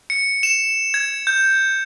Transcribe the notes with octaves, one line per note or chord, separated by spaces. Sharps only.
C#7
E7
G#6
G6